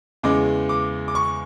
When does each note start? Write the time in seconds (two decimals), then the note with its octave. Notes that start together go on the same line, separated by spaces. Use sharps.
0.23 E2 C#3 G#3 D6
0.69 D6
1.08 D6
1.15 C#6